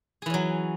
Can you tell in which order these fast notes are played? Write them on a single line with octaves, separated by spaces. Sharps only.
G#4 E3 C#4 F#3